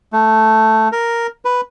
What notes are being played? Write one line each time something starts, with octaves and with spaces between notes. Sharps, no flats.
A3
A#4
B4